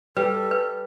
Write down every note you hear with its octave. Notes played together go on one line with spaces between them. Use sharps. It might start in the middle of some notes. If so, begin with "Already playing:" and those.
G3 A4 B4
B4